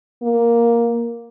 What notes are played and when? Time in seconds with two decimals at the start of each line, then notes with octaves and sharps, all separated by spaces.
0.22 A#3